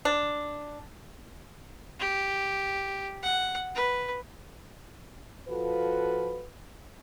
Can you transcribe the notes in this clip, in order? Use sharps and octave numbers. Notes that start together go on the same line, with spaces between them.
D4
G4
F#5
B4
F3 F4 F#4 A4 B4